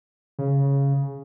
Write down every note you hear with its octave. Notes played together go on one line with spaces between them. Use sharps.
C#3